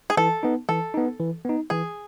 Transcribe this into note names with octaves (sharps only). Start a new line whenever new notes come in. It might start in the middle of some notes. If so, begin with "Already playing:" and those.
G#4
E3 A4
B3 D#4
E3 A4
B3 D#4
E3
B3 D#4
E3 G#4